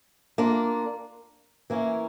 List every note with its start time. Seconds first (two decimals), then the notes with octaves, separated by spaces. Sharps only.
0.38 A#3 D4 F4
1.70 E3 A#3 C#4